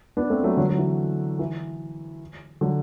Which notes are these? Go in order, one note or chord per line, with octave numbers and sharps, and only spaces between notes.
B3 D4
A3 C4
F#3 A3
D3 F#3
F#3
E3
E3
D3 F#3